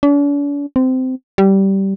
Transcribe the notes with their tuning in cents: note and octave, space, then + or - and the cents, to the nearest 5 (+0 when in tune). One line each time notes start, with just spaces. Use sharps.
D4 -45
C4 -20
G3 -15